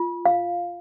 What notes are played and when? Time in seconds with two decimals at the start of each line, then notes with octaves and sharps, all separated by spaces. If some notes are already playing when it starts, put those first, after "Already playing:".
Already playing: F4
0.26 F5